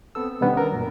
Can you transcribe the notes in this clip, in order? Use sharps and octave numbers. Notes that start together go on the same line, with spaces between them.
B3 C4 A4 E6
B2 D#3 G3 B3 C#4 D4
A#4
F#2 A#2